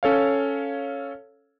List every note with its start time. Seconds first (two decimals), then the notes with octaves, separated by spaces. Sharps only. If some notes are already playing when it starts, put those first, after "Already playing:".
0.03 C#4 A4 C#5 F5